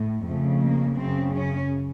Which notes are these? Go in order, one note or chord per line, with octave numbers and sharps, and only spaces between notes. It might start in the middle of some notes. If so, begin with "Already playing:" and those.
Already playing: A2
F2 C#3 A3
A#3
F#2 C#3 C4
C#4